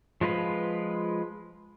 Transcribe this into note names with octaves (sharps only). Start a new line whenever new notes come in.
F3 G#3 F4 B4